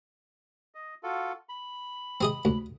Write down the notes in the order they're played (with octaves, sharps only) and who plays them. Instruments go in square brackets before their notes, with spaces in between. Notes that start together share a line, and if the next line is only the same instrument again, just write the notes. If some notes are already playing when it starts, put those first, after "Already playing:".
[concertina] D#5
F4 F#4 A4
B5
[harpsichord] C4 G#4 D#5
D2